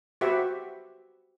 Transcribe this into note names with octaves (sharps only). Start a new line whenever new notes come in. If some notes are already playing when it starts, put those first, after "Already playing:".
F#4 G4 B4 C5 E5 F#5